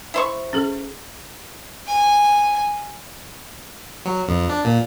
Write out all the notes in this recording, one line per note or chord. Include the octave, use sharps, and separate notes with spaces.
E4 C5 C#6
C#4 G#4 A4
G#5
F#3
F2
D4
A#2